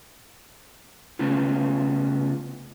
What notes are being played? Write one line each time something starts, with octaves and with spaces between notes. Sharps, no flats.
C#3 A3 B3 C#4 F4